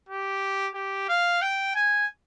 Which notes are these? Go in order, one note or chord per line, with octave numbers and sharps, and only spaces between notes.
G4
G4
F5
G5
G#5